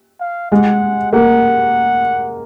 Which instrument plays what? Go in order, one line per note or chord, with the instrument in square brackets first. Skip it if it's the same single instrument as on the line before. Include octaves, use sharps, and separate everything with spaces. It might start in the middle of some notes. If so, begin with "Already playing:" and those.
[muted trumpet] F5
[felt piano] G#3 [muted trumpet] F#5
[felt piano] A#3 [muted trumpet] F#5